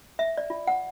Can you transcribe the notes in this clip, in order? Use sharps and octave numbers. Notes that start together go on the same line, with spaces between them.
E5
D5
F4
F#5